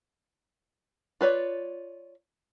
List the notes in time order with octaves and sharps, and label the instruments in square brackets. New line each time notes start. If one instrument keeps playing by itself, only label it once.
[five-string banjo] F4 B4 C#5 D5